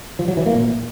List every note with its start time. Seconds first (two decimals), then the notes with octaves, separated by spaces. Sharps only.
0.19 F3
0.28 F#3
0.37 E3
0.46 A#3
0.55 A#2